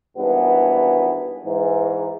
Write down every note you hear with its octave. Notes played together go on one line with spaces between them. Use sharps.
G#1 G2 E3 B3
G#2 E3